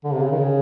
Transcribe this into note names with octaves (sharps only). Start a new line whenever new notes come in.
D3
C3
C#3
D#3
C#3